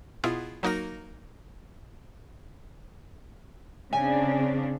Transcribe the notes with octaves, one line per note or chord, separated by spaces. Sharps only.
B2 B3 E4 F4 G#4
F#3 A#3 D#4 F#4 A#4 A#6
C#3 C4 D4 G#5